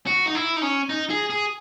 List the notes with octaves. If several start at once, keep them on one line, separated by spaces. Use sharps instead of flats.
F#4
D#4
E4
D#4
C#4
D#4
G#4
G#4